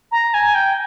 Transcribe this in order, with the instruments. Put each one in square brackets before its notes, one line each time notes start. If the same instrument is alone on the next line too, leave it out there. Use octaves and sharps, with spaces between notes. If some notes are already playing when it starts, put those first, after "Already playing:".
[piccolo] A#5
G#5
G5